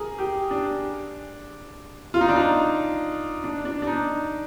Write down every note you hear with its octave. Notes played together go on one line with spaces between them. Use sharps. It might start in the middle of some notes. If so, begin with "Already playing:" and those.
Already playing: G#4 A#4
G4
D4
F4
D#4
D4
D#4
D4
D4
D4
D#4